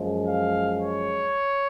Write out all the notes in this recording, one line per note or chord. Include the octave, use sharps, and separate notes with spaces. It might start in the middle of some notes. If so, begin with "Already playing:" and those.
Already playing: F#2 F3 G#3
F5
C#5